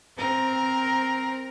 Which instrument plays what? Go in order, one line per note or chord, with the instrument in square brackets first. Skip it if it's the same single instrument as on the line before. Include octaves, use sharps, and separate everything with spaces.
[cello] C4 A#4